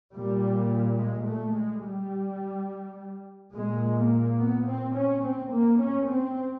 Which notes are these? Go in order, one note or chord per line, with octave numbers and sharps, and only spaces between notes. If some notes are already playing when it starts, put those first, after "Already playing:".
A#2 G3
G#3
A3
G#3
G3
A#2 G#3
A#3
B3
C4
C#4
C4
A#3
C#4
C4